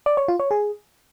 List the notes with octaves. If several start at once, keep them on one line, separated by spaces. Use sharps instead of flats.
D5
C#5
F4
C#5
G#4